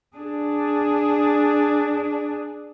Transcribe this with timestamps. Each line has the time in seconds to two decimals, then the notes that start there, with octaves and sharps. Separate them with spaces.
0.17 D4 G#4